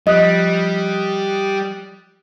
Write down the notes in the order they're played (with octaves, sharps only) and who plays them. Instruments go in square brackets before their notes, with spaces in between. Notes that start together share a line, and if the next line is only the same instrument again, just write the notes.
[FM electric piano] F3 D#6 F#6 [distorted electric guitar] G3 [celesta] D#5